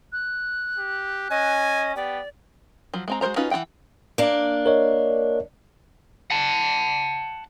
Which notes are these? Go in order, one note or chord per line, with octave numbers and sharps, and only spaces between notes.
F#6
G4
C#4 D#5 G#5
B3 G4 D5
F3 F#3
G#3 C4 A#5
G#3 F#4 A#4 C5 A#5
C#4 D#4 F4 F#4 B4
E3 F4 F#5 G5
A#3 D4
A#4 C#5 D#5
F#5 A5